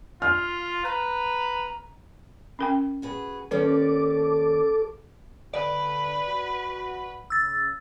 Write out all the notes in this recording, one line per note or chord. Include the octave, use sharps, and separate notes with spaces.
F4 F6
B4 A#5
C#4 A#4 G5
F#4 G#4 B4
D#2 C#4 A4 B4 D5 D6
D3 B4 D5
F#4
C#3 E6 A6